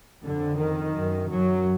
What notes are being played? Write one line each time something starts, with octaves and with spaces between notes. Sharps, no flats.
F2 D3
D#3
F#2
F#2 F#3